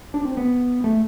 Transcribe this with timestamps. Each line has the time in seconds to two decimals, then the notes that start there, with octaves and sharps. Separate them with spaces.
0.14 D4
0.25 C4
0.37 B3
0.84 A3